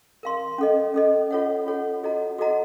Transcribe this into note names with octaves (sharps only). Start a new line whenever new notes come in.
A#4 F5 C6
C#4 A4 D#5
C#4 A4 D#5
F4 A4 C#5 F#5
F4 A4 C#5 F#5
F#4 A4 D#5 F#5 A#5
F#4 A4 D#5 F#5 A#5